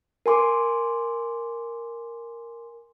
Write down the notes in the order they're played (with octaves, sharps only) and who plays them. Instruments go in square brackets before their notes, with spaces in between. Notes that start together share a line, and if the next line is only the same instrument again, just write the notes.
[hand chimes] A#4 G#5 C6 D6